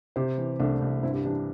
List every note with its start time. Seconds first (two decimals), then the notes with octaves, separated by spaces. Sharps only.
0.16 C3 G4 C5
0.38 E3
0.59 C2 A3 D4
0.82 C2
1.03 G2 C4 E4
1.14 D4 G4
1.25 E3 D4 G4